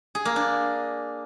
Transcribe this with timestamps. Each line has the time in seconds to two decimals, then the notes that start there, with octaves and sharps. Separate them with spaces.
0.15 G#4
0.25 A#3
0.36 D4